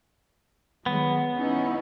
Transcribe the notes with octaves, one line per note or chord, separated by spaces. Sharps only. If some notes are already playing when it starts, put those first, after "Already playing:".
D#3 F#3 G#3 B3
C#4 D#4 E4